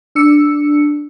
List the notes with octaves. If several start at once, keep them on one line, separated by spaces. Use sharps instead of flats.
D4 E6 C#7